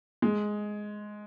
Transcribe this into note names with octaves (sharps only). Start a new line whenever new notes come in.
G#3